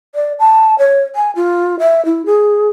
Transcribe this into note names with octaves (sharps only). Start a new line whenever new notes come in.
D5
A5
C#5
G#5
F4
E5
E4
G#4